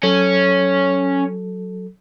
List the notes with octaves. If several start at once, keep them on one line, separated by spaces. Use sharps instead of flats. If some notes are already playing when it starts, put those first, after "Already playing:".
F#3 C#4 A4